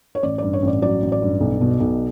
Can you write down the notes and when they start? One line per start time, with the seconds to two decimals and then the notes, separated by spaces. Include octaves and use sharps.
0.15 C#5
0.23 A1 D5
0.38 G2 D5
0.53 C#5
0.62 A1
0.68 D5
0.82 F#3 D5
1.02 A1
1.12 D5
1.22 G2
1.40 B1
1.61 B2
1.80 B1